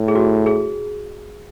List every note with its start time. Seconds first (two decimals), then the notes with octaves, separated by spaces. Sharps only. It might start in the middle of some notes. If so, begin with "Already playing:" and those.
Already playing: A2
0.08 G#4
0.15 F#4
0.46 G#4